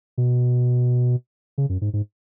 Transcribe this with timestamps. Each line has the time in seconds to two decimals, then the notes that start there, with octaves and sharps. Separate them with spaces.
0.18 B2
1.58 C#3
1.69 F#2
1.81 G#2
1.93 G#2